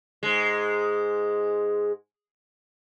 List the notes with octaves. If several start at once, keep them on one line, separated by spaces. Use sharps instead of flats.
G#2 G#3